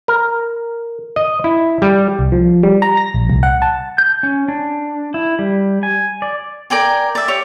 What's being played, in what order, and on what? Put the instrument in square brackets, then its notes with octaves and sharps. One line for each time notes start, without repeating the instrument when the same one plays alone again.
[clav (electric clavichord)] A#4
D#5
E4
G3
[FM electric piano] C2
F3
G3
A#5
A#6
A#1
C2
F#5
A5
[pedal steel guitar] G6
C#4
D4
E4
G3
G#5
D5
[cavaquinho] A#4 D5 G5 G#5
D5 E5
G4 C#5